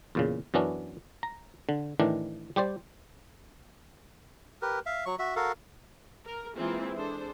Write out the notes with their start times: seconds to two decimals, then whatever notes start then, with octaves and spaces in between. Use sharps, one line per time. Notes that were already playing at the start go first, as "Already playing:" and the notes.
0.15 E2 A#2 C#3
0.54 F#2 E3 B3 C#4 D4
1.23 A#5
1.69 D3
2.00 A2 D#3 E3 D4
2.56 G3 G4 C5 D5
4.62 G4 A#4 B4
4.86 E5 F5
5.06 F#3 C#6
5.19 F#4 E5
5.36 F#4 A4 A#4 F5
6.25 A#4
6.56 E3 G#3 A#3 C4 E4 F4
6.94 D4 G#4 A4 C5